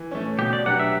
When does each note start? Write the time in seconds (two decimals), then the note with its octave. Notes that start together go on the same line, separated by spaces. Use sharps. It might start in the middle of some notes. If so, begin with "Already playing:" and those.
Already playing: E3
0.11 A3 C#4
0.39 B2 G4
0.53 D5
0.66 F#3 B3 D4 G4 F#5
0.79 E5